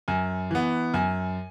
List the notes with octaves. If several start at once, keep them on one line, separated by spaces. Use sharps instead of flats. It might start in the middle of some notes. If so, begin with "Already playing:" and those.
F#2 G#5
E3 B3
F#2 G#5